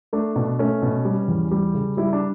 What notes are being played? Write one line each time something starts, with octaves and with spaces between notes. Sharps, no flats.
A3 D4
B2 D4
A3 C#4
B2
G3
E2
G3
C#3
G3 E4
D4